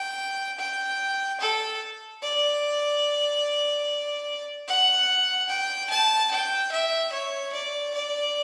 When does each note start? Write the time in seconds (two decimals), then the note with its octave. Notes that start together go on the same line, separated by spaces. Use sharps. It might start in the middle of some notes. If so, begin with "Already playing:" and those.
Already playing: G5
0.58 G5
1.40 A4
2.22 D5
4.67 F#5
5.49 G5
5.90 A5
6.31 G5
6.71 E5
7.12 C#5
7.53 D5
7.94 D5